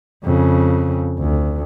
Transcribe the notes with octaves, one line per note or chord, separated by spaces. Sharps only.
F2 C#3
D2